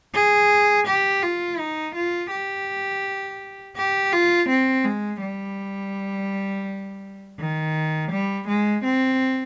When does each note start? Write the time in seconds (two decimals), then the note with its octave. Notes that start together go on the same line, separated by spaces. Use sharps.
0.14 G#4
0.87 G4
1.23 F4
1.58 D#4
1.95 F4
2.31 G4
3.77 G4
4.12 F4
4.49 C4
4.85 G#3
5.21 G3
7.39 D#3
8.11 G3
8.48 G#3
8.84 C4